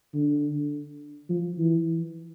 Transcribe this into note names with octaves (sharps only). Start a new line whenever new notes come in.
D3
F3
E3